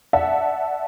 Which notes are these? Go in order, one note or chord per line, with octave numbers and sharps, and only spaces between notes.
D5 E5 F#5 A5